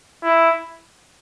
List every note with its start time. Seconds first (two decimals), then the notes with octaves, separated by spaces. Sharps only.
0.24 E4